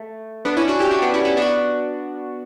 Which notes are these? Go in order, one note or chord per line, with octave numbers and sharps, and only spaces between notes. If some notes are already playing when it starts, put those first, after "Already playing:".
Already playing: A3
B3 D4
C#4 E4
D4 F#4
E4 G4
D4 F#4
B3 D4
C#4 E4
C#4 E4
B3 D4 F#4